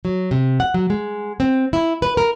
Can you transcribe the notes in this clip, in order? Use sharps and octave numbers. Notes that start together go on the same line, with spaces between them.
F#3
C3
F#5
F#3
G#3
C4
E4
B4
A#4